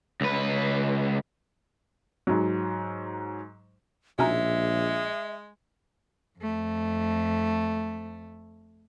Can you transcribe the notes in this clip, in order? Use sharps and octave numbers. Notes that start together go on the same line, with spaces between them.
C#2 B4
G#2 F#3
A#1 B2 G#3 C#4 D#4 E5
F2 A3